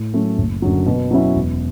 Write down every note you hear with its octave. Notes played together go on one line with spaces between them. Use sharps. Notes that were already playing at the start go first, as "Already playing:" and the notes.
Already playing: A2
F#3 A3 C#4 E4
F#1
F#2 D3 F#3
B2
F#3 C#4 E4
E1